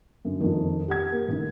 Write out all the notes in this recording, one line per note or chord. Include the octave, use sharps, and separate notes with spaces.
F#2 D3
F2 D#3
G4 F#5 G#6
A#3
A1 D#3